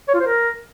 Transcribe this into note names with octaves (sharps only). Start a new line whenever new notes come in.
C#5
F4
C5
A#4